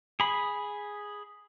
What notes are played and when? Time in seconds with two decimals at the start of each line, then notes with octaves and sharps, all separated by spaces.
0.20 G#4 B5